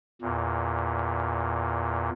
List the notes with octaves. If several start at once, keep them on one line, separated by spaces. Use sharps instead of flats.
E2 A#2